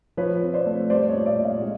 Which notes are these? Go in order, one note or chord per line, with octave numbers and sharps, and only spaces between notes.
F3 B4 C#5
C4
C5 D5
A3
G3 C5 D5
C#5 D#5
A#2
D5 E5
A#2
D#5 F5
G#3 F5